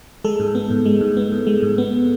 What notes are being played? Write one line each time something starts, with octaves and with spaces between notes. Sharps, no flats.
G#3 A4
G#2
B3
G#2
G#3
G#2
B3
G#2
G#3
G#2
B3